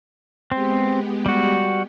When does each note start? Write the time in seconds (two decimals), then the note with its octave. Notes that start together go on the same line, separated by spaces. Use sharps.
0.52 G#3 B3 C4 G4
1.26 G3 F#4